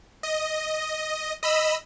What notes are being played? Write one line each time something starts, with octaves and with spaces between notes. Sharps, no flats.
D#5
D#5 B5 E6